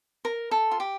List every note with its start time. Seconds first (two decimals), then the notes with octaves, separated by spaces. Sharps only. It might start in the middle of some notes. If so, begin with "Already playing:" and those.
0.25 A#4
0.51 A4
0.71 F4
0.80 G4